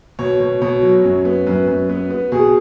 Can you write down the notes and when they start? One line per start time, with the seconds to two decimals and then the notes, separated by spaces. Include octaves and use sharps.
0.19 B2 C#5
0.40 B2
0.62 B2 C#5
0.83 F#3
1.04 F#2
1.25 B3
1.47 F#2 B4
1.68 F#2
1.89 B3
2.11 B3
2.32 B2 G#4